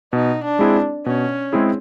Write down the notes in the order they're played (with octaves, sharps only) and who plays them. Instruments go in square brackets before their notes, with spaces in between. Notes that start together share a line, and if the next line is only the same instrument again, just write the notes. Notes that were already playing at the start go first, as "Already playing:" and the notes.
[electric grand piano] B2 [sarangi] D#4
[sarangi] D4
[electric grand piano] G#3 C4 E4 G#4
[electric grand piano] B2 [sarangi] C#4
[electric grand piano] G#3 C4 E4 G#4